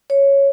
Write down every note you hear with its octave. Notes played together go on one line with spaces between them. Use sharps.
C#5